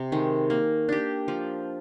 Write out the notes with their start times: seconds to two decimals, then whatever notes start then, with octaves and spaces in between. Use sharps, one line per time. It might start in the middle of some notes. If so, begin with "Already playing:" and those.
Already playing: C3
0.12 D#3 G#3
0.50 A#3
0.89 D4 G4
1.28 F3